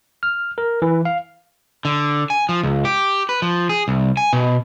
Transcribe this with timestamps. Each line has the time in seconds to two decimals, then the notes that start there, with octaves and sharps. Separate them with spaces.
0.23 F6
0.58 A#4
0.82 E3
1.05 F5
1.85 D3
2.30 G#5
2.49 F3
2.63 C#2
2.85 G4
3.29 B4
3.42 F3
3.69 G#4
3.88 C2
4.17 G#5
4.33 B2